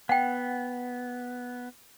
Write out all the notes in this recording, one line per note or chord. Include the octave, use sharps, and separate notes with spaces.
B3 F#5 G5